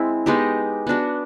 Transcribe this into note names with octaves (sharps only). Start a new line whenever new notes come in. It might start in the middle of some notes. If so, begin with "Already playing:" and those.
Already playing: G#3 C4 E4
G#3 B3 D#4 G4
B3 D4 F#4